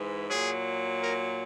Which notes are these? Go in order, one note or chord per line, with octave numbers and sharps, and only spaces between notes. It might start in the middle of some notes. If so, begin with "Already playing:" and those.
Already playing: G#2 E3 G#3
A#2 F#3 G#4
A#4